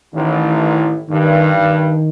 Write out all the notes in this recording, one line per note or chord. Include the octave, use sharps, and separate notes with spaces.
A1 A2 D#3
G2 D#3
D#3